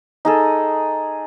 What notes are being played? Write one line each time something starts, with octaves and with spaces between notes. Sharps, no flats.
D#4 G#4 A4